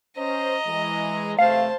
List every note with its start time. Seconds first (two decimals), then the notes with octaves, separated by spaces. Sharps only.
0.18 C#4 C5 D#5 A#5
0.68 E3 G#3
1.39 E2 C3 A3 C5 F5 A5